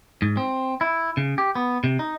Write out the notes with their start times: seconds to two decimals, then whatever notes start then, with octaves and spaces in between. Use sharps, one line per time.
0.22 G#2
0.37 C4
0.81 E4
1.17 C#3
1.38 G4
1.55 B3
1.84 C3
1.99 D#4